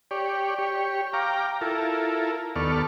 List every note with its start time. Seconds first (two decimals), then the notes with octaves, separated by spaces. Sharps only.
0.11 G4 C#5 D5
0.59 G4 C#5
1.13 F5 G5 A#5 D6
1.61 E4 F4 A4 A#4
2.56 D#2 B3 A4 D5 C#6 F6